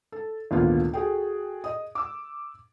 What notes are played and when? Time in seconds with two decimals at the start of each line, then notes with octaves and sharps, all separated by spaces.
0.12 A4
0.51 G#1 D2 A#2 B3 F4
0.93 F#4 G#4 A4 G5
1.64 D#5 D#6
1.95 D6 E6